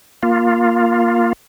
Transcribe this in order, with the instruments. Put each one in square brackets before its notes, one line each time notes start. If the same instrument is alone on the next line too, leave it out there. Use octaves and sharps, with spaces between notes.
[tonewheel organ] A#3 F4